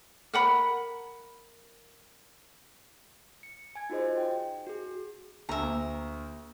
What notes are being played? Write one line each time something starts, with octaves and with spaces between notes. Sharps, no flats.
A#4 F#5 B5
C#7
G#5 G#6
D#4 F4 F#4 G#4 C5 D#5
G5
F#4 G#4
D2 E5 A#5
A#3